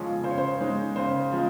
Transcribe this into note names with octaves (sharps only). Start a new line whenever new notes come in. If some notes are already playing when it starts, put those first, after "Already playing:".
Already playing: F2 C#3 F3 G#3 C#4
C#3 C5
C#5
C5
G#3 D#4
C#3 C5
F3 G#3